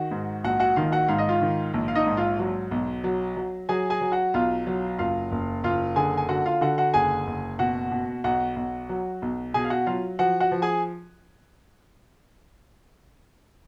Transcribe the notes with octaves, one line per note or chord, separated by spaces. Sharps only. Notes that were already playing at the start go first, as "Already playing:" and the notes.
Already playing: D#3 F#4 F#5
G#2
A#1 F#4 F#5
F#4 F#5
D#3 F4 F5
F#4 F#5
G#2 F5
D#5
F4 F5
D#3
A#1
F5
D#4 D#5
G#2
F4 F5
F#3
B1
F#3
F#3
F#3 G#4 G#5
G#4 G#5
F#3
F#4 F#5
B1 F4 F5
F#3
F#1 F4 F5
F#1
F#1 F4 F5
D3 G#4 G#5
G#5
D3 F#4 F#5
F4 F5
D3 F#4 F#5
F#4 F#5
F#1 G#4 G#5
F#1
B2 F#4 F#5
B2
B1 F#4 F#5
B1
F#3
B1
B2 G#4 G#5
F5
F#4 F#5
F#3 F4 F5
F3 F#4 F#5
F#4 F#5
F3
G#4 G#5